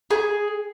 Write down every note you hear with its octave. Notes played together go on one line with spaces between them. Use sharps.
G#4